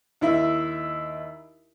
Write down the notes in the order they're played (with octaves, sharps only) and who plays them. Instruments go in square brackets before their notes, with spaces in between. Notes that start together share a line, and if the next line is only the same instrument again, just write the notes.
[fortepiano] D#2 E4 E5